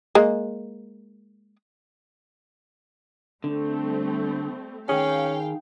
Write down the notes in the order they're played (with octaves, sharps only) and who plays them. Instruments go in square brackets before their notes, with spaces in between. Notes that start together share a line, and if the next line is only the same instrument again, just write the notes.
[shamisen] G#3 A#3
[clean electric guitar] D3 [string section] G3 A3 C4
[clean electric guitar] D#3 G#4 [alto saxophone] C#4 [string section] F5 G5